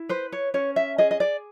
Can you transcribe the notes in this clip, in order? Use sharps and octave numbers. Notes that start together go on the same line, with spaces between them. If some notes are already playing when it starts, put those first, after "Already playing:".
Already playing: E4
B4 C5
C#5
C#4 C#5
E5
G#4 D#5
D#5
D5